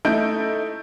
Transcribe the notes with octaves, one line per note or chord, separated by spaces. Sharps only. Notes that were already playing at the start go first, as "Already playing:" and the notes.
A3 D#4 E4 A4 G6 D7